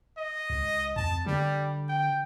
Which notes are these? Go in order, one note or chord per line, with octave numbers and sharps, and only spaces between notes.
D#5
C#2
F2 A5
D3 G3
G5